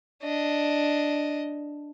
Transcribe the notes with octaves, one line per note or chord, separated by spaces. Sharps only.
D4 D#5